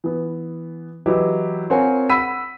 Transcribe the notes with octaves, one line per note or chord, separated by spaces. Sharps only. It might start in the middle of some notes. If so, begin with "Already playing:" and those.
E3 B3
E3 F#3 E4 G4 B4 D#5
C4 F4 A#4 C#5 F#5 G#5
F#5 B5 E6 B6 D#7